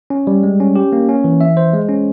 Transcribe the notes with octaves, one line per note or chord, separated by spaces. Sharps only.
C#4
G3
G#3
C#4
G4
A#3
C#4
E3
E5
C5
G#3
C#4